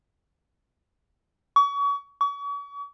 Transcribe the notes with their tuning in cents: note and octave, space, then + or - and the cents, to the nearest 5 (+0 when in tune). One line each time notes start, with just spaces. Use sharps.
C#6 +35
C#6 +40